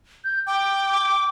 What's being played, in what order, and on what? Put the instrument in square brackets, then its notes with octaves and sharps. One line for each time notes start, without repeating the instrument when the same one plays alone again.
[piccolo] G6
[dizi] G5 [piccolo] D6
[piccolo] D6